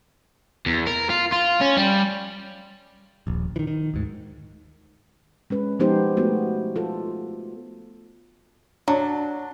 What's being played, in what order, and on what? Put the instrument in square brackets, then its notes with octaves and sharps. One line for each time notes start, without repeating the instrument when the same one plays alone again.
[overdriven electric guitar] E2
A#4
F4
F4
C#4
G3
[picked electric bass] D#1 A#1
D#3 E3
D#3
D2 G#2
[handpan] G#3 C#4 B4
F3 G#3 B3 D#4 G4 C5
A3 B3 F#4
F4 A4
[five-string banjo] F#3 [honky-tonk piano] D4